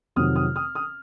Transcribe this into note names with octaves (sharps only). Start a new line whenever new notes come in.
F1 F2 C3 D#3 F#3 D#6 F6
D#6 F6
D#6 F6
D#6 F6